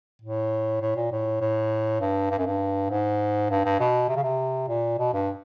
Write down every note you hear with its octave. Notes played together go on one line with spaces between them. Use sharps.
A2
A2
A#2
A2
A2
G2
G2
F#2
G2
G#2
G2
G2
B2
C3
C#3
C3
A#2
B2
G2